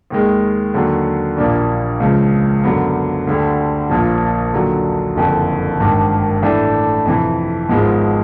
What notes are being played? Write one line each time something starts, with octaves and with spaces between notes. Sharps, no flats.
D#2 D#3 G#3
D#2 D3 F#3
A#1 A#2 G3 A#3 D4
C#2 C#3 F3
F#2 D3 F#3 B3
D2 D3 G3
A#1 A#2 F3
D#2 D3 F#3
F#1 F2 D3
G#1 G2 D#3
A2 E3 A3 D4
F2 C3 E3
G#1 G#2 F3 G#3 B3